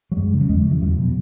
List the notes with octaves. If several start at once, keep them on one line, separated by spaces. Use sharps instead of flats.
F#3
F#2 G#3
C#3
F#3
E2 G#3
F#3
C#3
E3
E2 F#3
B2 F#3